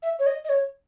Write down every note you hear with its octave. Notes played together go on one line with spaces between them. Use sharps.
E5
C#5
D#5
D#5
C#5